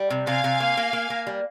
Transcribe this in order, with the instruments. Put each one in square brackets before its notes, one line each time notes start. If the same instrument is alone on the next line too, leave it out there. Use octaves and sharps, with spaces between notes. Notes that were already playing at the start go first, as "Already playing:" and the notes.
Already playing: [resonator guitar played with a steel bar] G3
C3
[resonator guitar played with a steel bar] C3 [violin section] F5 G#5
[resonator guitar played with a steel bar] C3
A#3
A#3
A#3
A#3
G3